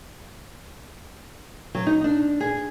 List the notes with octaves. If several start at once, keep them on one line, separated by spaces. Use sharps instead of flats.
F#3
D#4
D4
G#4